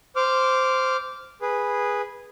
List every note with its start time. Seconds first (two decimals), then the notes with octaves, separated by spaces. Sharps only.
0.16 C5 D6 F6
1.42 G#4 B4